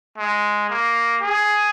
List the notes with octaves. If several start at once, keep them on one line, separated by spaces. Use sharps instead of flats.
G#3
A#3
G#4